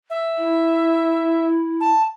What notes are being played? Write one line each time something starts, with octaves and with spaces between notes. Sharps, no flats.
E5
E4
A5